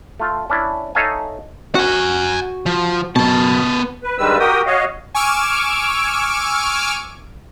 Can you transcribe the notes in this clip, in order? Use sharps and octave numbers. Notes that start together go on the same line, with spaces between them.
A3 F4
C#4 D4 E4
D#4 A4 C#5 E5 F5 G#5
F#4 F#5 G#5
F3
F#2 B2 B3 A5
B4
G2 D#3 G3 G#3 B4 E6
F#4 G4 A#4 G5 D#6
F#4 C#5 D#5 F5
G#5 C#6 D6 E6 F6 D7